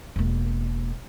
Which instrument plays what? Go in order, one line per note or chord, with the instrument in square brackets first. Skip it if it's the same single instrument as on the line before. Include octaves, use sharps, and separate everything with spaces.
[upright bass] E1 A#3